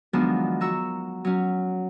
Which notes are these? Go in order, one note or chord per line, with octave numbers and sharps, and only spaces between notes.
D#3 F3 F#3 G#3 B3 D4
F#4 A#5 C#6 E6
F#3 C#4